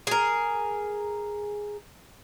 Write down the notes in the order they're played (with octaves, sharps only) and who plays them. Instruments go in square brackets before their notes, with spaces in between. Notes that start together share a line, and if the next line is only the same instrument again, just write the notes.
[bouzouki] G#4 A#4